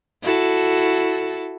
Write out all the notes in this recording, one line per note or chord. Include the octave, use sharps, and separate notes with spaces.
E4 F#4 A4